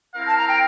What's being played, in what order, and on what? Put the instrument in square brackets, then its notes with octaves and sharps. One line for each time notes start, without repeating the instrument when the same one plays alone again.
[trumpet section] C4 E4 A#4 F5
[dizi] A5
A#5
G5